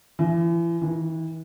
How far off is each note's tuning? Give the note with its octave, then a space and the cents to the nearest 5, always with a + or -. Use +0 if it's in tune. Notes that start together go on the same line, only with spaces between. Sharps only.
E3 +35
E3 -35